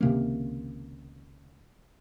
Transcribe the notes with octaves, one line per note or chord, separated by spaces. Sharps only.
C#2 C3 D#3 A#3